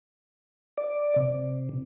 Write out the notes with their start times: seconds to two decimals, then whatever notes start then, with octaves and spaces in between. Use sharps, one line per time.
0.77 D5
1.16 C3